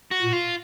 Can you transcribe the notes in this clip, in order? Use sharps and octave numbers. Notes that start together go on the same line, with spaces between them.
F#4
A#2
F4